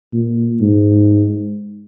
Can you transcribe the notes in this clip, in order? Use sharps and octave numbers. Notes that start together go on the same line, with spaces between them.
A#2
G#2